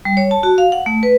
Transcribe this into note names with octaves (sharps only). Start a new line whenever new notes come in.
G3
C#5
A5
F#4
F5
F#5
A3
B4